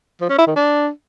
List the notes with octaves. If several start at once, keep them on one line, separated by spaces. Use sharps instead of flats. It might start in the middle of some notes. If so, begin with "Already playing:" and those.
F3
C#4
E4
D#3
D4